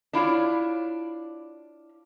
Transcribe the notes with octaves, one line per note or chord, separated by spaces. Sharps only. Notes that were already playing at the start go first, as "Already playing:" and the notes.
D4 E4 F4 C#5